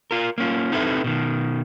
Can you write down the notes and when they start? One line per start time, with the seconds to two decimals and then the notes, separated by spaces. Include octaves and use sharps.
0.11 F4 A#4
0.38 A#3 C#4 F4
0.72 C4 D#4 E4 A4 B4 E5
1.04 B2 D#3